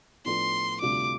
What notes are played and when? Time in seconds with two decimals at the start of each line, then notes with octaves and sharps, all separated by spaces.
0.25 A2 F3 B3 D4 A4 C6
0.81 D2 C3 G3 D4 F4 D6